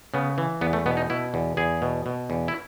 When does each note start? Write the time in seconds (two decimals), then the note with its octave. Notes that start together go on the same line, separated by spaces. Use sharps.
0.14 C#3 B3
0.38 E3
0.61 E2 B3
0.73 A3
0.86 B2 B3
0.97 D#4
1.10 B2 E4
1.34 E2
1.57 E2 G#4
1.82 B2
2.06 B2
2.30 E2
2.48 E4